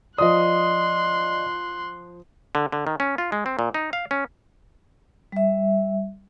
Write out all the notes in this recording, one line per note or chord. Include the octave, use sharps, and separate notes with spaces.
F3 D5 D#5 C6 D#6 F#6
D3
D3
D#3
C#4
F4
G#3
C4
A#2
D#4
F5
C#4
G3 E5